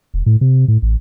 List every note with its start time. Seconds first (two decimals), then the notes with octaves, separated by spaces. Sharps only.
0.14 E1
0.26 A2
0.41 C3
0.68 A2
0.82 A1